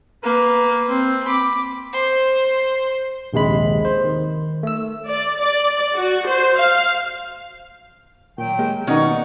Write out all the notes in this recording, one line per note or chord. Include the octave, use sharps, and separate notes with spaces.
A#3 B4
C4
B5 D6
C5 C6
A#1 D#2 C3 G#3 B5
C5
D#3
A3 E6
D5
D5
F#4
C5
F5
A#2 D#3 F#3 G5
G#3 A#3 G4
B2 D#3 C#4 D#4 D5 F#5